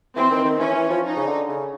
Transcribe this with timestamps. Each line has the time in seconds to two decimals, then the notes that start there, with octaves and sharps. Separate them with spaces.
0.16 E3 C4
0.31 D#3
0.45 D#3
0.59 E3 C#4
0.75 E3
0.90 F3
1.04 D#4
1.16 C#3
1.26 D3
1.49 C#3